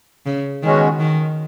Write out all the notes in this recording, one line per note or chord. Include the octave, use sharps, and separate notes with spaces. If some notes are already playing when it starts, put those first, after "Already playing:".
C#3
B2 D#3 G#3 C#4 F#4
D#3